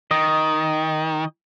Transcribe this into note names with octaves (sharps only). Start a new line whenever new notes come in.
D#3 D#5